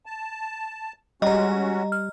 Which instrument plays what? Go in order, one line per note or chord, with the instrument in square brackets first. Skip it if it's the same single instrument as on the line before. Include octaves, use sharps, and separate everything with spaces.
[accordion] A5
[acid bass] G3 [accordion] G#3 C#4 F#4 [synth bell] D#5 A#5
[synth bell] F6